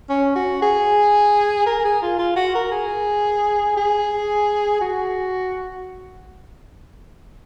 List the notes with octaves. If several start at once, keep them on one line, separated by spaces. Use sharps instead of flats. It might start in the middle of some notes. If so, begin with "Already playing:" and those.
C#4
F#4
G#4
A#4
G#4
F4
F4
F#4
A#4
G#4
G#4
F#4